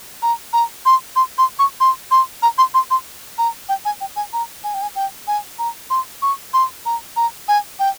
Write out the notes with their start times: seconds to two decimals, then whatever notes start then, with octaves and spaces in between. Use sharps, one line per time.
0.22 A#5
0.53 A#5
0.86 C6
1.16 C6
1.38 C6
1.59 C#6
1.80 C6
2.11 C6
2.42 A#5
2.58 C6
2.74 C6
2.91 C6
3.38 A#5
3.69 G5
3.85 G#5
4.01 G5
4.16 G#5
4.33 A#5
4.64 G#5
4.74 G5
4.82 G#5
4.96 G5
5.27 G#5
5.59 A#5
5.90 C6
6.22 C#6
6.54 C6
6.86 A#5
7.16 A#5
7.48 G#5
7.79 G5